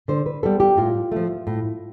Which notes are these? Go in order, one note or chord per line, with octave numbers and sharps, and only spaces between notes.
D3 C5
B4
G3 B3 A4
G4
A2 F4
F3 A3
A2